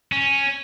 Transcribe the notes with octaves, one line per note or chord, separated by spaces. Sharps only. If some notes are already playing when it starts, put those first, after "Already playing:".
C#4